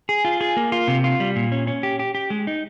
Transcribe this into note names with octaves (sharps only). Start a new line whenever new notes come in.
G#4
F4
G#4
A#3
F4
C3
F4
G3
A#2
C#4
C#4
G4
G4
G4
G#3
D#4